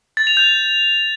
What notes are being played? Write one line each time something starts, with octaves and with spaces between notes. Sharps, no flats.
A6
F7
G6